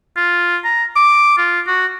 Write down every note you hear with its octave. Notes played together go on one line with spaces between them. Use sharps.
F4
A#5
D6
F4
F#4